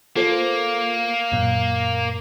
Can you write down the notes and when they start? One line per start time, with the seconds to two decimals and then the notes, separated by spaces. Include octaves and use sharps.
0.16 A#3 F4 A4 C5
1.32 F#2 A#2